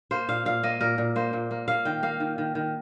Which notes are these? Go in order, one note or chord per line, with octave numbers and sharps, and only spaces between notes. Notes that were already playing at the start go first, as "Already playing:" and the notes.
A#3 C5
A#2 F5
A#2 F5
A#3 D#5
A#2 A#4
A#2
A#3 C5
A#2
A#3
A#3 F5
D#3 G5
A#3 F5
D#3
D#3
D#3